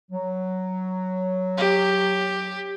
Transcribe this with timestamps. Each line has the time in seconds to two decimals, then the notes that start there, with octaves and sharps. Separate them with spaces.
0.11 F#3
1.57 G4